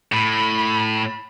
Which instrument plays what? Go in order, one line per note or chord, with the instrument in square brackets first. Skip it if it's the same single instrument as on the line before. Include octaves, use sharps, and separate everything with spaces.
[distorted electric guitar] A2 [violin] B5